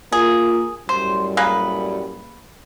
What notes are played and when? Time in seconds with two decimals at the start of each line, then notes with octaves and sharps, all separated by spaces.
0.12 A#3 F4 G#4
0.89 F#2 A2 G3 C5
1.37 A#3 G#4 B4